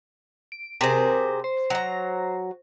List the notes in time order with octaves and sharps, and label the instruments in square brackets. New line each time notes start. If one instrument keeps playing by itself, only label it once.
[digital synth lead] D7
[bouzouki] C3 G#4 C5 [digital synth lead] A#4
[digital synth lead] C5
[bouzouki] F#3 A#5